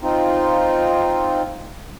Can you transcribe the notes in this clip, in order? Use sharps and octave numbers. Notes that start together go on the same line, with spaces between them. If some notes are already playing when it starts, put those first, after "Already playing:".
C4 D#4 F4